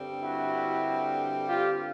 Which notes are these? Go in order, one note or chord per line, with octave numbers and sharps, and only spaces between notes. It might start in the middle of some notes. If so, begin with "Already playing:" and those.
Already playing: G2 D3 G3 C4
E4 F#4
F4 G4